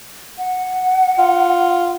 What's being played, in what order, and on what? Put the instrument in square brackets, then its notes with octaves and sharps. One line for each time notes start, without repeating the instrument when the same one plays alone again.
[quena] F#5
[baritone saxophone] F4